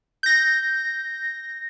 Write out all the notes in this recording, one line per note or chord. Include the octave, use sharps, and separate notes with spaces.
G6 A#6